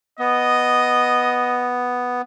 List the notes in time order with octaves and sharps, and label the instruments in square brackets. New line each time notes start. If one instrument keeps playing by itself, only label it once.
[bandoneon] B3 [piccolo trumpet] D#5